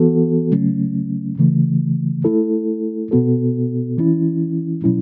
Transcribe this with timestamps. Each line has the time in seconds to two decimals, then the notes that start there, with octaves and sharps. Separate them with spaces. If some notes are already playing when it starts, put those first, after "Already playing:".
Already playing: E3 B3 F#4 A4
0.51 C#3 F#3 A3 C#4
1.38 C#3 E3 A3
2.24 A3 E4 A4
3.11 B2 B3 F#4 A4
3.98 E3 C#4 E4
4.84 B2 F#3 C#4 E4